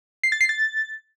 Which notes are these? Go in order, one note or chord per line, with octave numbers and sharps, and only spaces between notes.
C7
A6
C7
A6